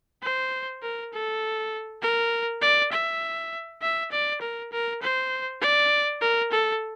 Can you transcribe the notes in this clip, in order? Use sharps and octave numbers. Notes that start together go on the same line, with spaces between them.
C5
A#4
A4
A#4
D5
E5
E5
D5
A#4
A#4
C5
D5
A#4
A4